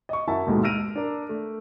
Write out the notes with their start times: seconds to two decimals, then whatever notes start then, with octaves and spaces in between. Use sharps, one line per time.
0.09 D#5 C#6
0.28 F#2 E4 F#4 E5 A5
0.46 D#2 G#2 B2 G#3 A3
0.63 E6 F6 A#6 D7 D#7 F7
0.95 D4 A#4
1.29 A3